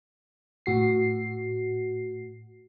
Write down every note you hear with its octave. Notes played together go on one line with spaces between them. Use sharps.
A2 F#4 C7